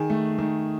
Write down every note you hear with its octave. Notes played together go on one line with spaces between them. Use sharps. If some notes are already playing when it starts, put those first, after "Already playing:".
Already playing: D#3 G#4
A3
D#3